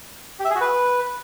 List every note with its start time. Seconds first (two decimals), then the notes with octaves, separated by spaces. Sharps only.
0.39 G4
0.45 E5
0.50 G#4
0.55 F#4
0.61 B4